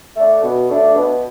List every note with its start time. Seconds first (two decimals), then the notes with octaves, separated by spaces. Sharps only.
0.16 A3 D4
0.42 B2
0.69 A3 D4
0.95 B2